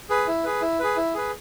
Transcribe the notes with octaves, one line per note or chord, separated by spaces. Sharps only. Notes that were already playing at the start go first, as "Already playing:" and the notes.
G#4 B4
E4
G#4 B4
E4
G#4 B4
E4
G#4 B4